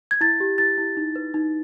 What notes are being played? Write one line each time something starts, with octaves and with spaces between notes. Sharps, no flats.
G#6
E4 A6
G4
E4 A6
E4
D#4
B4
D#4